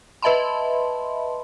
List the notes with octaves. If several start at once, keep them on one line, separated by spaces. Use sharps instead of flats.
B4 D#5 E5 A5 B5 C6